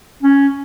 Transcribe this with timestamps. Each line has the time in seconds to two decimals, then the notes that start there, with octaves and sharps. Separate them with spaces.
0.22 C#4